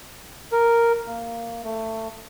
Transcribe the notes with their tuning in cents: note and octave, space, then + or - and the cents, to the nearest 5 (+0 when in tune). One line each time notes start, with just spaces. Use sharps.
A#4 +0
A#3 -10
A3 +20